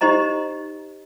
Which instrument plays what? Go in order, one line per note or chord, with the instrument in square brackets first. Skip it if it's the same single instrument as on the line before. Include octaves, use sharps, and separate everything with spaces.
[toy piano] D#4 G4 C5 D#5 A#5